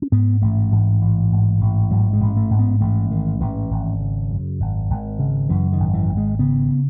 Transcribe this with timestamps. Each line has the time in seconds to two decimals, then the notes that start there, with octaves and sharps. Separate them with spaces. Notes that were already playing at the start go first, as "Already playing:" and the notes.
0.02 C#4
0.12 G#2 B3
0.42 A1 A3
0.71 G#2 E3
1.01 A1
1.32 G#2
1.61 A1
1.91 G#2 F#3
2.13 G#3
2.20 A1
2.37 A3
2.50 G#2
2.59 B3
2.81 A1 A3
3.11 G#2 D#3
3.40 A1 E3
3.70 G#1
4.00 C#3
4.31 F#2
4.60 G#1
4.90 G#1
5.19 C#3
5.49 F#2 E3
5.72 D#3
5.80 G#1
5.94 E3
6.09 G#1
6.17 G#3
6.39 C#3 B3